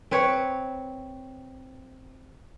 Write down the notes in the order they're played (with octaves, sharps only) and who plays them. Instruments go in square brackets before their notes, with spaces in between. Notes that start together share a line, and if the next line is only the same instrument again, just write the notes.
[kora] C4 B4 C#5